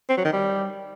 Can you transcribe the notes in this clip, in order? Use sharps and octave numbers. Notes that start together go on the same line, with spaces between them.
C4
F#3
D#3
G3